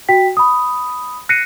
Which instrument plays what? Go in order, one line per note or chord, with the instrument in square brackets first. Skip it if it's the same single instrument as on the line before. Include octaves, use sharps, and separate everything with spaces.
[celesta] F#4 G5 B6
B5 D#6
F#6 A#6 C7 C#7 D#7